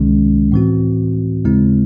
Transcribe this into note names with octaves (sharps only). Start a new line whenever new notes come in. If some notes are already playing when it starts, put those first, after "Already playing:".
Already playing: C#2 C3 D#3 G#3 C#4
A2 E3 C4 F#4
D#2 C#3 G#3 C4 E4